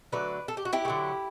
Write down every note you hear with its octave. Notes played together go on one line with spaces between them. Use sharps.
D3 F#3 A3 B4 D5
A4
G4
F#4
E4 G4
A3
D3 F#3